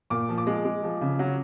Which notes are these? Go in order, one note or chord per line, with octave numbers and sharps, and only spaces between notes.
A#2 D6
F3
D6
G#3
G#3
F3
C#3
F#3